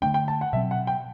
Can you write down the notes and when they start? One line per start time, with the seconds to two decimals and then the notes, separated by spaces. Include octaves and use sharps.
0.02 D3 A3 D4 G5
0.14 G5
0.28 A5
0.41 F#5
0.53 B2 F#3 C4 E5
0.71 F#5
0.87 G5